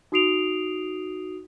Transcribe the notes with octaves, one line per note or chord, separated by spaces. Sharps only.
D#4 F#4 D#6 C7 D7 F7